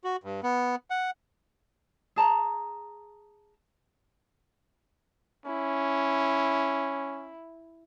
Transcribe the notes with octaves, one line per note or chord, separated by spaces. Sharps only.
F#4
G2
B3
F#5
G#4 A5 A#5
C#4 E4